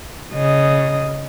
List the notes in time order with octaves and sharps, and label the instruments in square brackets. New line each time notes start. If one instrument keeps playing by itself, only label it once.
[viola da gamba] C#3 D#5